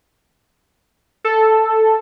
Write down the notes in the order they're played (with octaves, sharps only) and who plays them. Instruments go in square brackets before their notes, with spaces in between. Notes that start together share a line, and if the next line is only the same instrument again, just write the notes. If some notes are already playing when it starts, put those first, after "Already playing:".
[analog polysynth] A4